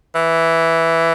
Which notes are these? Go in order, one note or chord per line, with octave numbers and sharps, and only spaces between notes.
E3